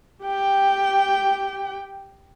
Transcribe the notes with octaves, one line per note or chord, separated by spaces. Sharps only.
G4 G5